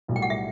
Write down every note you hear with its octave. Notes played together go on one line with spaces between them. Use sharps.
B1 A2 G3
G5
F#5
E5